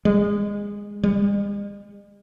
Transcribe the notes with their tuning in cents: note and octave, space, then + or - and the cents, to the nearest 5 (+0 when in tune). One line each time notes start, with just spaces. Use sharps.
G#3 -20
G#3 -45